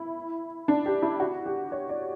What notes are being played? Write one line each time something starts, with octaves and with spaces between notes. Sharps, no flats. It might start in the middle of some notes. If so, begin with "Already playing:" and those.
Already playing: E4
D4
G4
E4
F#4
G4
C#5
D5